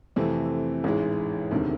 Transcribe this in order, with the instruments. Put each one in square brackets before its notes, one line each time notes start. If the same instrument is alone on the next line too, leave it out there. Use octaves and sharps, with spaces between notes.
[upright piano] F2 C3 E3 A3 C4
A1 G#2 E3 G#3
E1 D2 C3 D#3